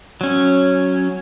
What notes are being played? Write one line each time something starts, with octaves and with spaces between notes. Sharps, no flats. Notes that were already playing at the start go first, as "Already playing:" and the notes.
F#3 C#4